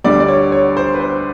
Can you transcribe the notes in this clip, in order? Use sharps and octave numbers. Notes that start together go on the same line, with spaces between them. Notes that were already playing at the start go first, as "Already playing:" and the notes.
D2 D3 G3 D5
D5
C#5
C#5
C5
B4
C5